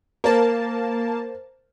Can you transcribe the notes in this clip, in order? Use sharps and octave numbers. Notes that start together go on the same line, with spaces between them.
A#3 A#4 C5 A5